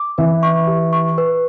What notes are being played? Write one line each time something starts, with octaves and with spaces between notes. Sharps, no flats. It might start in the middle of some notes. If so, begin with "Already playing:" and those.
Already playing: D6
E3 B4
C#6
G4
C#6
B4